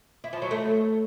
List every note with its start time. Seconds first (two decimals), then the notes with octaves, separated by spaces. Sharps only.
0.24 E4
0.33 F3
0.42 F#3
0.51 A3